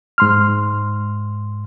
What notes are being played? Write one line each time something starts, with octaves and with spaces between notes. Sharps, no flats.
G#2 C6 F6